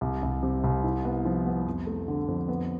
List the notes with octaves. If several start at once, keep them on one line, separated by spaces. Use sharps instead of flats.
C2
C2
C3
C2
E4
B3
F3
B3
F2
A3
D3
F2
B3